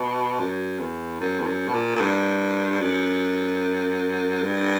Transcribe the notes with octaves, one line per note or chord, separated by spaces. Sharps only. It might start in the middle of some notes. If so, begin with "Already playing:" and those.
Already playing: B2
F#2
E2
F#2
E2
F#2
B2
A#2
A#2
G2
F#2
G2